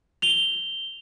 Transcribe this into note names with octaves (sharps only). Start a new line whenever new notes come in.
F7 G7